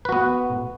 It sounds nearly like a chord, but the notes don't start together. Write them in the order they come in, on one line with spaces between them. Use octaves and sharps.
B4 F#4 B3